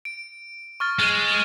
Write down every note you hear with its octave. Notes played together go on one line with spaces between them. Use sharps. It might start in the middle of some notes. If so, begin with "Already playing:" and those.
D7
C#6 F6 A6
G#3 A6